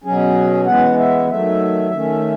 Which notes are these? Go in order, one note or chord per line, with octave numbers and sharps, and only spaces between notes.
B2 F#3 C#4 G#4
E3 G#3 B3 F#5
E5
D#3 F#3 A3 E5
D#3 A3 C#4